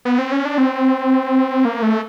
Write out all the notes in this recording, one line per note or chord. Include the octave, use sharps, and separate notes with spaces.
B3
C4
C#4
D4
C4
A#3
A3